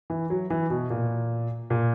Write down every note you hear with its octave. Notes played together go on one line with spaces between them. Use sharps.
E3
F#3
E3
B2
A#2
A#2